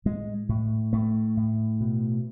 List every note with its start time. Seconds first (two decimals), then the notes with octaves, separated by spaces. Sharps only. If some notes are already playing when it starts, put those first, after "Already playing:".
0.05 A2 G#3
0.49 A2
0.93 A2 A3
1.37 A2
1.81 B2